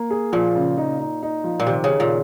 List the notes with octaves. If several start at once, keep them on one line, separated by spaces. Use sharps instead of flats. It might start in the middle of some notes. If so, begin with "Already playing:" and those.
Already playing: A#3
G#4
A#2 F3
C#3
D#4
D#4
D#4
F3
A#2
C3 D#3
C#3
D#3
A#2